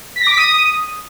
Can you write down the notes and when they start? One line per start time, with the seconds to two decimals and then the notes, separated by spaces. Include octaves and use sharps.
0.16 B6
0.21 A#6
0.27 D6
0.32 B6
0.37 D#6